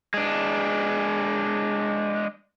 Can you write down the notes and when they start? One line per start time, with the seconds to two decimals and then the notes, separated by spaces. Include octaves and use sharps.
0.14 G#3 D4